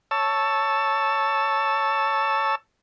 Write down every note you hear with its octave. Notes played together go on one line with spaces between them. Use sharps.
C#5 A5 E6